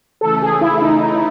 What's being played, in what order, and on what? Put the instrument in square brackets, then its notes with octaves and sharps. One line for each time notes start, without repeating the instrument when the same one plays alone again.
[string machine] C#3 E3 A3 [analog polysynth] A4
[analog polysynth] G#4
E4
E4
D#4
D#4
E4